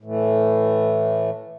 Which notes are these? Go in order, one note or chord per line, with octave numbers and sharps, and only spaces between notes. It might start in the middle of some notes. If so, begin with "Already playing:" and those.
A2 E3 A3